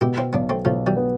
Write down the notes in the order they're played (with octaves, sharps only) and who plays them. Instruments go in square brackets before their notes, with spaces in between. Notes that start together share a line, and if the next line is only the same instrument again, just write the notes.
[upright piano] B2 [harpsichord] E4 G4
[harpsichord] C4 E4
[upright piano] B1 [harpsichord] B3 D4
[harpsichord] A3 C4
[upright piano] B1 [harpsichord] F3 A3
[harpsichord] E3 G3
[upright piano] B3